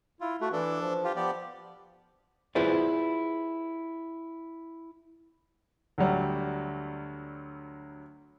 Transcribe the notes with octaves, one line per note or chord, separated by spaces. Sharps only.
E4 F4
A3 F#4
E3 D4 A4
F3
F4 G4
F3 B3 G4 D5
E4 F4 G#4 B4 C5 D5
D2 F#3 G3